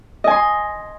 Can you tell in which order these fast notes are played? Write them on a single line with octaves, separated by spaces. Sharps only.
D#5 G#5 C6